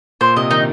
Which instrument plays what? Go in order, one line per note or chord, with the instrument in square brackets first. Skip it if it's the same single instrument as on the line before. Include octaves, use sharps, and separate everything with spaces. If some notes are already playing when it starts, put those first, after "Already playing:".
[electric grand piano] A#2 [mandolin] C5
[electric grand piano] C3 [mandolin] D#5
[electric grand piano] D#3 [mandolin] D#4